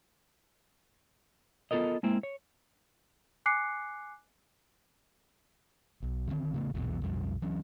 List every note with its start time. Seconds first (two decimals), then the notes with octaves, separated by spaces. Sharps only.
1.71 B3 F4 A4 A#4 D#5
2.03 G#3 A#3 C4 E4
2.23 C#5
3.46 G#5 D6 F#6 C7 C#7
6.02 B1
6.28 D3 D#3 G3 C4
6.54 C#3 A3 B3
6.74 A#1 E2 B2 E3
7.02 B1 F2 G3
7.42 E3 F#3 C#4